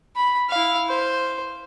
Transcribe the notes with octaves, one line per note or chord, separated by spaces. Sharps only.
B5
E4 F5
C5